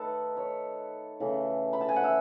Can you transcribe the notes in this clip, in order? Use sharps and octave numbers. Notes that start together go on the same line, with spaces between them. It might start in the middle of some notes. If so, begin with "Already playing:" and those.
Already playing: D#3 A3 A4 B4 C#5
C#5
C#3 E3 A3
B5
A5
G#5
F#5
E5